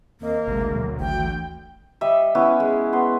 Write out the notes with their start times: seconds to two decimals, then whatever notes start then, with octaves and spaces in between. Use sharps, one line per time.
0.21 D#2 A#3 C4 D#5
0.47 G#1 D2 C3 G#3
0.76 B2 F#3
1.00 G#1 E3 A3 F#4 G5
2.01 G3 D#5 E5
2.35 B3 C#4 E4
2.60 G#3
2.93 B3 C6